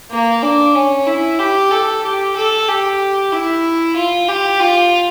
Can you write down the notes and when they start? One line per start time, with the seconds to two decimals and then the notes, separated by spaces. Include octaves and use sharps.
0.11 A#3
0.43 D4
0.75 C#4
1.07 E4
1.39 G4
1.71 A4
2.03 G4
2.36 A4
2.68 G4
3.32 E4
3.96 F4
4.28 G4
4.60 F4